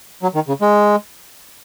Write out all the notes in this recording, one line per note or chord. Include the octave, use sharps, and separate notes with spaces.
F#3
D#3
C#3
G#3